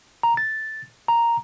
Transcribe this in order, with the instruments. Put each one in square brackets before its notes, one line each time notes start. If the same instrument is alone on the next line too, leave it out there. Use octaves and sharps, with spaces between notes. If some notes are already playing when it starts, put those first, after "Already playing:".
[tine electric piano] A#5
A6
A#5